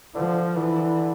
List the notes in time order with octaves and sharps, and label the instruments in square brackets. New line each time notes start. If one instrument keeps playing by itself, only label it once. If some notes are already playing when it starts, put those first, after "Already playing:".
[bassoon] D3 [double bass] F3
[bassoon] D3 [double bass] E3